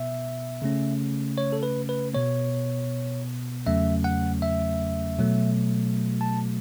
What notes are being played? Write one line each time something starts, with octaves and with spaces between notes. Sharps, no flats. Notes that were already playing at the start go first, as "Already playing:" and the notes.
Already playing: B2 B3 E5
C#3 A3 C#4
C#5
A4
B4
B4
B2 B3 C#5
E2 C#3 F#3 A3 C#4 E5
F#5
E5
B2 F#3 A3
A5